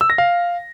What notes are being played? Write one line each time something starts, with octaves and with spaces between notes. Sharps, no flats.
E6
A#6
F5